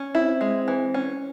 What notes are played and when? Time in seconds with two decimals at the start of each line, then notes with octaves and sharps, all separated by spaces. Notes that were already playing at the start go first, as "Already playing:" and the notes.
Already playing: C#4
0.14 C4 E4
0.41 G#3
0.68 E3
0.94 C#4